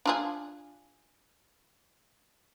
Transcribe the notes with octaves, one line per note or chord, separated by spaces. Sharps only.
D4 F4 G#4